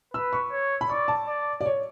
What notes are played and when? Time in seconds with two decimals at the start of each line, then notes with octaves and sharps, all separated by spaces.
0.14 B4 E6
0.33 C#6
0.52 C#5
0.81 B5
0.89 D5 C#6
1.08 A5
1.28 D5
1.61 D5
1.66 C#5